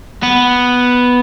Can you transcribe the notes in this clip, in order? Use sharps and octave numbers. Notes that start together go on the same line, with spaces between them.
B3